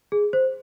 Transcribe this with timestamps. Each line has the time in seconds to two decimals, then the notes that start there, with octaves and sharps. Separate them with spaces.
0.12 G#4
0.33 C5